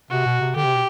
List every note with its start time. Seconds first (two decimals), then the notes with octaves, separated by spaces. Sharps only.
0.10 C3 F#4
0.26 B2
0.41 C3
0.56 D3 G4
0.65 C3
0.74 B2